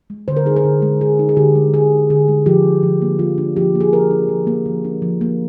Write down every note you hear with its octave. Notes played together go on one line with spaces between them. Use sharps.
G#3
D3 C5
A#4
D#4 G#4
A#4
D3
G#3
D3 G#4
D#4
G#4
D3 G4
G#3
D3 G#4
D#4
D3 G#4
G#3
F3 G4
D4
F3
A#3
F3 F4
D4
F3 G4
A#3
G#4
F3 A#4
D4
F3
A#3
F3
D4
F3
A#3